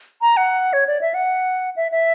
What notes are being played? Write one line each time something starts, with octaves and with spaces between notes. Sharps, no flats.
A#5
F#5
C#5
D5
E5
F#5
E5
E5